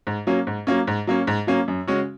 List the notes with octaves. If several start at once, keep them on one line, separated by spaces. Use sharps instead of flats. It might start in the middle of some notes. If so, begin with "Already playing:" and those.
G#2
F#3 A#3 C#4
G#2
F#3 A#3 C#4
G#2
F#3 A#3 C#4
G#2
F#3 A#3 C#4
F#2
C#3 G#3 C#4 F#4